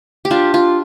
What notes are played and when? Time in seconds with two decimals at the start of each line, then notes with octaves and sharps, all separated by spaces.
0.25 G4
0.31 D4 F4
0.54 F4